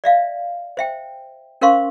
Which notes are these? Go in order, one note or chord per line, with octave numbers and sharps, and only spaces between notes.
D5 E5 F5
C5 E5 G5
C#4 A#4 C5 F5 C6 C#6